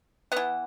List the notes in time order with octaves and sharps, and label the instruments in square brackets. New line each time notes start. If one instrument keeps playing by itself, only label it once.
[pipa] E3 B3 F#5